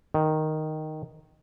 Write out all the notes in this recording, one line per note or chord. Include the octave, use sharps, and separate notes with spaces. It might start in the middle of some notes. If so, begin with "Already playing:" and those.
D#3